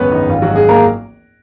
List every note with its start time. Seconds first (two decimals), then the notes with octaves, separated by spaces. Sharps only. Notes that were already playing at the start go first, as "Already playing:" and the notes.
Already playing: G#1 C#2 F#2 B3 C#4 B4 C#5
0.12 G#1 D#4
0.29 G#1 F4
0.42 G#2 F#3 F#4
0.56 G#3 G#4
0.69 A#3 A#4